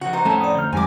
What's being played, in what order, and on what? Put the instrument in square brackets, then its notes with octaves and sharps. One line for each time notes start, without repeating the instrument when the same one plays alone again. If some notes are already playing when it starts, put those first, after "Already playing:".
[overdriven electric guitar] C#3 F3 [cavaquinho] F#4 [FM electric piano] F#5
[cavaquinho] D#4 F#4 C5
[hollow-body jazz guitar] F2 A3 C#4 [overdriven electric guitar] A2 A5
[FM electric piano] D5 D#6
[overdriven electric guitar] D2 [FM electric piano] F6 G6
[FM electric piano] F2 D#3 G3 [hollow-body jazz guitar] G#2 [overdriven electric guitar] C4 [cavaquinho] G#5 D6